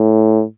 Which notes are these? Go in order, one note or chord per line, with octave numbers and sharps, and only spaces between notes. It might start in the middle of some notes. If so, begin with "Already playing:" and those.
Already playing: A2